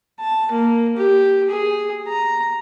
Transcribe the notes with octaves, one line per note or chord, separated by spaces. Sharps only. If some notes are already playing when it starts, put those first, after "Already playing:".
A5
A#3
G4
G#4
A#5